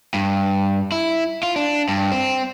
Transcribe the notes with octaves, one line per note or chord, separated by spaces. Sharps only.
G2
E4
F4
D4
G2
C4